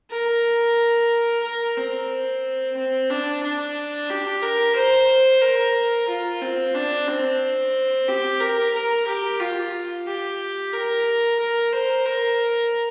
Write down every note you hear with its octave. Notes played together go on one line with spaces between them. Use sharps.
A#4
A#4
C4
C4
D4
D4
G4
A#4
C5
A#4
F4
C4
D4
C4
G4
A#4
A#4
G4
F4
G4
A#4
A#4
C5
A#4